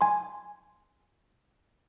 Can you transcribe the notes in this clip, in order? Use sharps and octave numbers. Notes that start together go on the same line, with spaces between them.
G#5 C6